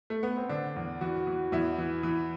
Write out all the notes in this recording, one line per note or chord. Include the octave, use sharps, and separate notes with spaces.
A3
B3
C4
D3 D4
E2
E3 F#4
E3
E2 E4
E3
E3